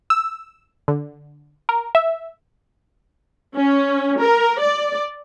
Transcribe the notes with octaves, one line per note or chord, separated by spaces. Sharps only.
E6
D3
A#4
E5
C#4
A#4
D5